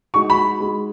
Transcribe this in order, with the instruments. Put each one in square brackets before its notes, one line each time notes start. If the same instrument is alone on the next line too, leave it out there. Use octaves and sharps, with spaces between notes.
[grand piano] G#3 D#4 F#4 [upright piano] C#6
[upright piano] B5
[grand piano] G#3 D#4 F#4